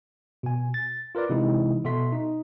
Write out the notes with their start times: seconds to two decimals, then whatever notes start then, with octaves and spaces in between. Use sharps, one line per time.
0.43 B2 G#5
0.74 A6
1.15 F4 A#4 B4 D5
1.29 C3 E3 G#3 D#4 E4
1.84 B2 F#4 A4 E5 C6 B6
2.12 D#4